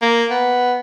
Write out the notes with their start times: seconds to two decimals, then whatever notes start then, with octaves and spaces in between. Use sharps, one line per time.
0.02 A#3
0.30 B3